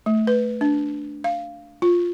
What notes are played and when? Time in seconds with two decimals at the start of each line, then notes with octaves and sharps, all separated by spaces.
0.06 A3
0.27 B4
0.61 D4
1.24 F5
1.82 F4